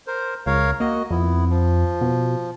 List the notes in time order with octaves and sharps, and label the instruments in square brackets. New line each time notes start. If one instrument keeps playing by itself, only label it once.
[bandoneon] A#4 C5
[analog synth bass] C#2 [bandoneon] A#4 C#5 F5
[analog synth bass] A#3 [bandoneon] F#4 D#5
[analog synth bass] F2 [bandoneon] B3 E4
[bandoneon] F3
[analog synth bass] B2